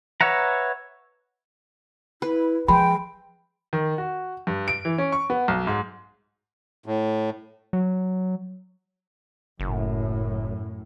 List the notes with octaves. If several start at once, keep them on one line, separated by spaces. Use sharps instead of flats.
B4 C#5 E5 F#5 A#5
E4 B4
F3 G#3 G5 B5
D#3
F#4
G2
D7
E3
C#4
C#6
B3
B1
G#2
A2
F#3
F#1 F#2 A2